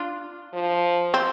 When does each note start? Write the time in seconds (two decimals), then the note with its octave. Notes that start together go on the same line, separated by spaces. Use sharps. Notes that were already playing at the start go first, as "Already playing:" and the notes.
Already playing: D4 F4
0.53 F3
1.14 C4